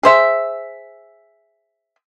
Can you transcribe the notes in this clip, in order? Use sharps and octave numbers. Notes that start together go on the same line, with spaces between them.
G#4 C5 E5